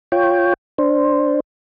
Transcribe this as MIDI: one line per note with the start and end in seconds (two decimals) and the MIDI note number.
0.12 0.54 65
0.12 0.54 73
0.12 0.54 79
0.78 1.40 62
0.78 1.40 72